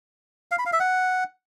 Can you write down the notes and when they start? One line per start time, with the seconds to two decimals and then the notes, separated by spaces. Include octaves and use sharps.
0.51 F5
0.59 B5
0.66 F5
0.73 E5
0.80 F#5